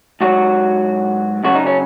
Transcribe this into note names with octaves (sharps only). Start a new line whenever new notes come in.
G#2 F#3 F#4
F#2 C#3 F#3 F#4
D#4
C#4